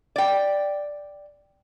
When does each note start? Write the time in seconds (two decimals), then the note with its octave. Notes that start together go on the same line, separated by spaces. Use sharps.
0.16 D5 G5